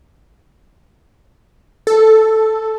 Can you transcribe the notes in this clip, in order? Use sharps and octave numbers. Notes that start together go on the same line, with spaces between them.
A4